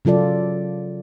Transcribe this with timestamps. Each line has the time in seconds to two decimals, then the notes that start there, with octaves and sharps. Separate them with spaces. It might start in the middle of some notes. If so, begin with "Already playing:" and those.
0.05 C#3 F#3 F4 A4 D5